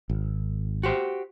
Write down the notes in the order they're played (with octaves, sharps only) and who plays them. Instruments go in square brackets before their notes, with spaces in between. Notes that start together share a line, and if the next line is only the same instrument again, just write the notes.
[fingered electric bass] G#1
[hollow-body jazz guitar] F#4 G4 C5